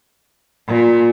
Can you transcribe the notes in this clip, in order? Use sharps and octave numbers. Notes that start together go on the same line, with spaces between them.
A#2